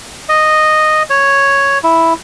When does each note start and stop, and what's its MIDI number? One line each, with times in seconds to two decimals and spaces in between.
0.29 1.03 75
1.10 1.78 73
1.84 2.13 64